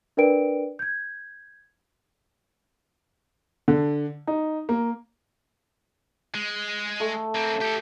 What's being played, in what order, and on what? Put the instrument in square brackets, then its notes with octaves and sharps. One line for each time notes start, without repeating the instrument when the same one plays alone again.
[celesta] D4 A#4 B4 D5 G5 D7
G6 G#6
[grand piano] D3
D#4
A#3
[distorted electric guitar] G#3
[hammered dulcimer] A3
[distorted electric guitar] A#3 C4
G4 A4